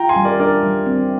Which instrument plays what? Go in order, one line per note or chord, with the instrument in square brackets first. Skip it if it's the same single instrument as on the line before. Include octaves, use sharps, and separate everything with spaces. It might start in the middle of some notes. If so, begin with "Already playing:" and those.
Already playing: [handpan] F4 [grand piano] G5 A#5
[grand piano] G#5 C6
[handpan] G3
[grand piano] A#4 D5
[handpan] D4 [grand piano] A#4 D5
[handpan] G3
C4